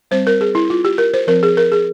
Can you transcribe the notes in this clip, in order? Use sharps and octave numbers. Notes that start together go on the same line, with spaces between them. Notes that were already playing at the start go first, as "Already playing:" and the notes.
G3 C4 C5
A#4
G#4
E4
F4
G4
A#4
C5
F3 C4 A#4
G#4
A#4
G#4